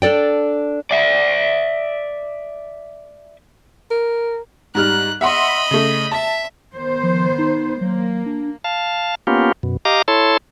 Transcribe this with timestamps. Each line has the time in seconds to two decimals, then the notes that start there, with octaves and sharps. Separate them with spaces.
0.02 D4 A4 D5 G5
0.91 D5 E5
3.91 A#4
4.75 G#2 G3 F6 F#6
5.21 D#5 E5 F#5 B5 C6
5.71 C#3 A3
6.11 E5 A5
6.74 D#3 B3 C5
7.03 F3
7.38 D#4
7.81 F#3 A#3
8.26 D4
8.64 F5 A5
9.27 A#3 B3 C#4 F4 G4
9.63 F#2 B2
9.85 G4 D#5 F5 A#5 D6
10.08 E4 A4 C#5 A5 C6